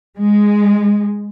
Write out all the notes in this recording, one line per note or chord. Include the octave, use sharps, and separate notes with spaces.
G#3